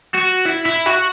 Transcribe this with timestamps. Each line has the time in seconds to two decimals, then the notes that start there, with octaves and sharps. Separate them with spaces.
0.15 F#4
0.46 E4
0.66 E4
0.86 F#4